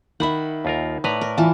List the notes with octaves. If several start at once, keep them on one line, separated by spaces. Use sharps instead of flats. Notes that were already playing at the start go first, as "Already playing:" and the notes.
D#3 E5 F#5 B5
D#2 F4 A#4
A2 B4 D5 A#5
A#4
E3 F4 A5